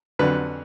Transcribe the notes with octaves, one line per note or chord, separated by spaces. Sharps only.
F2 D3 F#3 B4